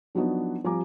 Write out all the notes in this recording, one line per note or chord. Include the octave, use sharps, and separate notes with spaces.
F3 F#3 B3 D4 D#4 F#4
F3 G3 C4 G#5 A#5 D6